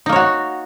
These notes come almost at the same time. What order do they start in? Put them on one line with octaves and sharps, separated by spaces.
D#4 A#3 C#5 F#4